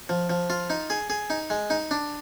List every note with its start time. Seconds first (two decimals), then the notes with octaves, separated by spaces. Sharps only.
0.09 F3
0.30 F3
0.50 F4
0.70 D#4
0.90 G#4
1.10 G#4
1.30 D#4
1.50 G#3
1.70 D#4
1.91 D4